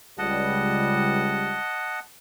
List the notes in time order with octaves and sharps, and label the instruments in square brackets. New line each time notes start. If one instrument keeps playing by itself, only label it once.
[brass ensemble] C#2 G3 [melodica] D#5 F#5 A5